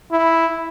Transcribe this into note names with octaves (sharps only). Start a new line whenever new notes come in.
E4